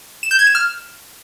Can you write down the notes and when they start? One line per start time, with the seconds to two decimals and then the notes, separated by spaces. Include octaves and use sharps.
0.23 E7
0.31 G6
0.39 G#6
0.47 E7
0.55 F6